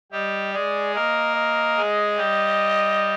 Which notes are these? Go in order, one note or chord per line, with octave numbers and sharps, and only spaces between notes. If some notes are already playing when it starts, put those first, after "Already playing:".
G3 G4 D#5
G#3 G#4 D5
A#3 A#4 D#5
D#5
G#3 G#4
G3 G4